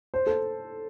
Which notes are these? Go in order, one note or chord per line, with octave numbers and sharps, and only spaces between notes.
C5
A4